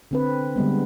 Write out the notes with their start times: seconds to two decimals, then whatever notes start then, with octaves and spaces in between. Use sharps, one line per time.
0.11 D3 C4 B4
0.56 D3 G3 G#3 B3